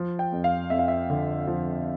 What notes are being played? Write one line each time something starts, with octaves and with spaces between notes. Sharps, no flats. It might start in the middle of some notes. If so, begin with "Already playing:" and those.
Already playing: F3
G5
F2
F5
F2 E5
F5
E5
D3
F3